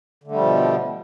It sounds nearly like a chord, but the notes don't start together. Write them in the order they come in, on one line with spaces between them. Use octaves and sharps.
D3 A3 G3 F3 B2